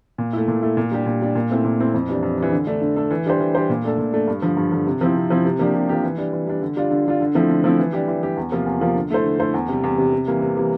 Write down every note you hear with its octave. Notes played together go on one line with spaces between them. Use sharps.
A#2
A3 E4
A#2
A3 E4
A#2
G3 D4 G4
A#2
G3 D4 G4
A#2
A3 C4 E4
A#2
A3 C4 E4
F2
E3 G3 D4
F2
E3 G3 D4
D3
A3 D4 A4
D3
A3 D4 A4
E3
G3 D4 G4 C5
E3
G3 D4 G4 C5
A#2
A3 D4 A4
A#2
A3 D4 A4
G2
D3 F3
G2
D3 F3
C3
F3 C4 E4
C3
F3 C4 E4
C3
F3 A#3 D4 G4
C3
F3 A#3 D4 G4
E3
G3 D4
E3
G3 D4
D3
G3 D4 F4
D3
G3 D4 F4
D3
F3 A3 C4 E4
D3
F3 A3 C4 E4
E3
G3 D4 G4
E3
G3 D4 G4
E2
C3 F3 A#3 F4
E2
C3 F3 A#3 F4
D3
A3 E4 A4 C5
D3
A3 E4 A4 C5
E2
C3 G3
E2
C3 G3
C3
E3 G3 A#3
C3
E3 G3 A#3